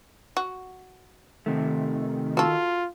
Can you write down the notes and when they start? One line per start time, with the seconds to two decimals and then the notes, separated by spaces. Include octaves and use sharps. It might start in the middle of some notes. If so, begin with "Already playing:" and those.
0.37 F#4
1.46 C3 D#3 A3
2.37 F4 F#4 A4